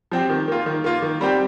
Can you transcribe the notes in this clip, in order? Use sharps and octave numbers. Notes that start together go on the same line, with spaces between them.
F3 C4 G4
D#3
A#3 F4
D#3
A#3 F4
D#3
G3 C4 G4